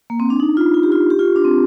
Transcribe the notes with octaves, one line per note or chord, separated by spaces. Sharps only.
A#3
C4
D4
D#4
F4
F4
G4
F4
G4
F4
D4
C4